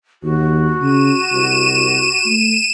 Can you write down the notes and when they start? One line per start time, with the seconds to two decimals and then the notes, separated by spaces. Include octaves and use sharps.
0.23 D#2 F#4
0.81 C#3 D#7 E7
1.32 C2
2.26 A3